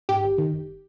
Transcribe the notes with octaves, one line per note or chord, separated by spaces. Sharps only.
G#2 G4
G#1
D#3
G1